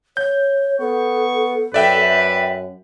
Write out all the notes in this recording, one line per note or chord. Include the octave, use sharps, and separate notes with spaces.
C#5 G6
B3 A4 C#6
F#2 B4 D5 E5 G5